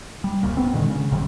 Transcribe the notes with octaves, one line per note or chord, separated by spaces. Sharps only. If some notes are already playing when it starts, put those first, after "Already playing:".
G3
D#1 C2 A#2
B3 C4
A#2 D3 D#3 G#3
C#3
G1 C3 D#3 G3